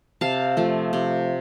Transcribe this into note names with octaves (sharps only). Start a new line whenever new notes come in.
C3 F5 A5
F3 A3
C3